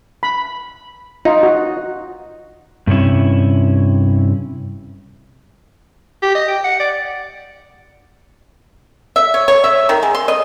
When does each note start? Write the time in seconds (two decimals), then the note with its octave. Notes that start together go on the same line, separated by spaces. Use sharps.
0.23 B5
1.25 D#4 F4
1.43 F#4
2.87 G2 C3 C#4 E4
6.22 G4
6.35 D#5
6.48 G5
6.65 F#5
6.80 D5
9.16 E5
9.34 C#5
9.48 C#5
9.64 E5
9.89 D#3
10.03 G#3
10.15 C6
10.28 D#5